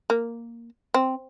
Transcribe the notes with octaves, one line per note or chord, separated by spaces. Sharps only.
A#3
C4